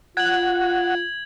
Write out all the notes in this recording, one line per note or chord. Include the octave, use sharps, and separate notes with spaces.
F4 F#5 G#6 F#7